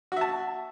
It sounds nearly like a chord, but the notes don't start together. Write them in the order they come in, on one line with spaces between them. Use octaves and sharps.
F#4 E5 A5